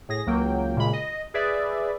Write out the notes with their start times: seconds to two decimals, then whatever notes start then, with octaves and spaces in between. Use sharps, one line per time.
0.09 A2 G#4 A#6
0.26 C#2 F#3 A#3 G5
0.76 A#2 C#3 G#3 B5
0.93 D#5
1.34 G#4 B4 D5 E5